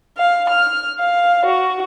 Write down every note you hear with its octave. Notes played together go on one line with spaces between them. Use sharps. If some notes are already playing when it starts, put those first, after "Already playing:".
F5
F6
F5
F#4